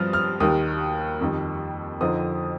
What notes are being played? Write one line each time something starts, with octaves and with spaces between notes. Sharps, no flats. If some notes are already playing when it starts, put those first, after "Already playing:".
Already playing: G2 F3 C4 D#6 F6
F6
D#2 D#3 G3 D#6
F2 D#3 G3
F2 D3 F3 C4 D#4 D#6